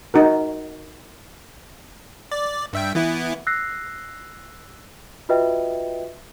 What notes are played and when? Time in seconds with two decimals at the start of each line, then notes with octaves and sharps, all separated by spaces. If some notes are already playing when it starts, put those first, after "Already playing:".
0.14 D#4 F#4 A#4
2.32 D5
2.73 G2 E5 G5
2.95 E3 B3 E4
3.47 E6 F#6 A#6 C7
5.29 F4 F#4 B4 D#5 E5 G5